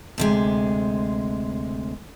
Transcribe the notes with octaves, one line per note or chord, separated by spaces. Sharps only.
D2 C3 G#3